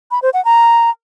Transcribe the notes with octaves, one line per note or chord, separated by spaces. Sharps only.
B5
C5
F#5
A#5